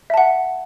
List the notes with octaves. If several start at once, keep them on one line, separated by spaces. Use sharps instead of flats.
E5 F#5 A5